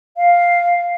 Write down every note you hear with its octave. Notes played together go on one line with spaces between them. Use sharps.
F5